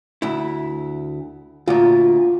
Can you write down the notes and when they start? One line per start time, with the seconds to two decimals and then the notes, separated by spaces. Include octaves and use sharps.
0.22 D2 E4
1.68 D2 A#2 F4